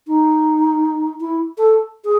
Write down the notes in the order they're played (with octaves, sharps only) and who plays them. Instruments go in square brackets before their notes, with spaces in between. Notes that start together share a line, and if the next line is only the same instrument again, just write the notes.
[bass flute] D#4
E4
A4
G#4